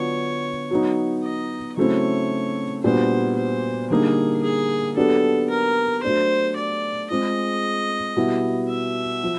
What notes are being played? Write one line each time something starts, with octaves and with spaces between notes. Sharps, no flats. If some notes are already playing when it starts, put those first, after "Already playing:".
Already playing: D3 F#3 B3 D4 F4 C#5
F#3 B3 D#4
D#5
C#3 F#3 A3 C4 E4 C#5
A#2 G3 B3 D4 F#4 C5
C5
D3 G3 A#3 D#4 G#4
G#4
F#3 B3 D4 G4 A4
A#4
F#3 A3 D4 C5
D5
G#3 C4 F4 G#4 D#5
B2 G3 B3 E4
E5
F3